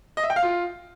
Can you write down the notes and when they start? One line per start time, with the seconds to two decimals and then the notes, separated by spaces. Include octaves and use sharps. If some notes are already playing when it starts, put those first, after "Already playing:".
0.17 D#5
0.23 E5
0.30 G5
0.36 F5
0.43 F4